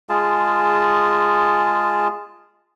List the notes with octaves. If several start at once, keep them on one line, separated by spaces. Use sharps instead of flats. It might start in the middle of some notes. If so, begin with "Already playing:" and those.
G#3 F4 G#4 A5